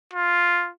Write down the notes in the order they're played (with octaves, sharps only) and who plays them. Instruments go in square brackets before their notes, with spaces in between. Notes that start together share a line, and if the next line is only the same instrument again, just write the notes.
[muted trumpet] F4